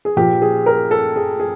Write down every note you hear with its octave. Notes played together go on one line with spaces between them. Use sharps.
G#4
A#2 F3 G4
G#4
A#4
A4
G#4
G#4